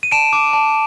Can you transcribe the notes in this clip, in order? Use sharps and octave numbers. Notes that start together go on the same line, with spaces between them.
D#7
A5 D7 E7
D6
A5